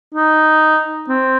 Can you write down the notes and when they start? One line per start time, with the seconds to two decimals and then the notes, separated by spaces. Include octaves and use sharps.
0.15 D#4
1.09 C4